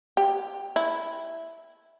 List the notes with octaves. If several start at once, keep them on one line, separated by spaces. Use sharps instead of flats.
G4
E4